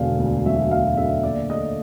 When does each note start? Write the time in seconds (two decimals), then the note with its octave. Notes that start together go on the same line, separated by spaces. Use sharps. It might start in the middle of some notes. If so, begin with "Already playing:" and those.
Already playing: E1 D3 F5
0.20 D2
0.46 F#3 E5
0.71 E1 F5
0.97 D3 E5
1.23 A#2 D5
1.50 A3 D#5